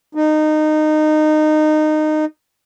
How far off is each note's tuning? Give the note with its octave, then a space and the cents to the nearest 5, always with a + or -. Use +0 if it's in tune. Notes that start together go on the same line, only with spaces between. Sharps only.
D#4 -20